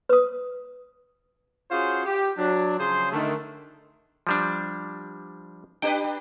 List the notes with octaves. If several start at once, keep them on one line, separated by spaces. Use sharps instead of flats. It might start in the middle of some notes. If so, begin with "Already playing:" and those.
B4 D#6
C#4 F4 F#4 G#4 C5 C#5
G4
F#3 D4
C#3 F3 F#3 G#4 C5 C6
D3 D#3 A3
F3 G3 D4
D4 G4 B4 G5